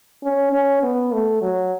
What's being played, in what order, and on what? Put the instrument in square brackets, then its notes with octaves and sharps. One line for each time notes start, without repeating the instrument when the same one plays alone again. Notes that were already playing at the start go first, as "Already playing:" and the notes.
[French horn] C#4
C#4
B3
A3
F#3